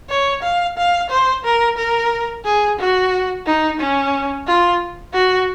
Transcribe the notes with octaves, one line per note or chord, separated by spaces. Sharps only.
C#5
F5
F5
C5
A#4
A#4
G#4
F#4
D#4
C#4
F4
F#4